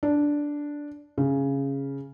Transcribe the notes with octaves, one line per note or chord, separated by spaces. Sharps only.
D4
C#3